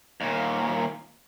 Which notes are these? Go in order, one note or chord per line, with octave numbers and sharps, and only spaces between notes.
D#2 A#2